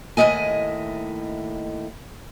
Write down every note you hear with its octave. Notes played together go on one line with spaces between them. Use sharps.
D#2 A2 D#3 E4 D#5 G#5